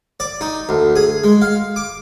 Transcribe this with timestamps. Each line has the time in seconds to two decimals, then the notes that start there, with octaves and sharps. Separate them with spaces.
0.20 D5
0.41 D#4
0.69 D2
0.96 G#4
1.24 G#3
1.42 F5
1.76 D6